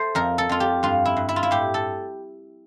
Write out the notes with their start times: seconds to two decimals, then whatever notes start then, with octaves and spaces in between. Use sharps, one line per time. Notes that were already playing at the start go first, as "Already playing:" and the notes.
Already playing: A3 C5
0.15 F2 A#4
0.38 A4
0.49 F2 F4
0.60 G4
0.83 G2 F4
1.06 E4
1.17 G2
1.29 E4
1.36 F4
1.43 E4
1.51 A2 G4
1.74 A4